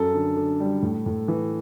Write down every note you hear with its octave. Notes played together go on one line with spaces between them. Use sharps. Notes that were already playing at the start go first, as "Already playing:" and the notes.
Already playing: F#2 A4
D3
D3
G3
A2
A2
E3